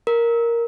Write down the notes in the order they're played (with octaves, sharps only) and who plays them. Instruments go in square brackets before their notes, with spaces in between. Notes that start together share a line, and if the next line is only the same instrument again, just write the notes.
[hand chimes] A#4